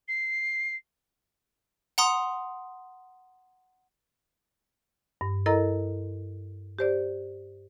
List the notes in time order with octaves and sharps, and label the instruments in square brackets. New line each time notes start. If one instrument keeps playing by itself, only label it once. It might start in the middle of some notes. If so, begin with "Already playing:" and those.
[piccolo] C7
[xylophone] F#5 A#5 C6 D#6
[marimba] G2
E4 A4 A#4 D#5 A#5
G4 C5 D5